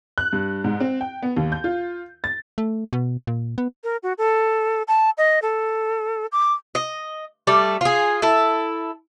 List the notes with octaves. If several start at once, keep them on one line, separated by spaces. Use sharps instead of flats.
F#6
G2
G#2
C4
G5
B3
D#2
G6
F4
A6
A3
B2
A#2
B3
A#4
F#4
A4
A5
D#5
A4
D6
D#5
G3 A3 D5
F4 G#4
E4 A4